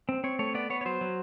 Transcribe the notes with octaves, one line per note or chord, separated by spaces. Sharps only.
C4
C4 C#5
A3 C#5
B3 D5
B3 C#5
C#5
F#3 C5
F#3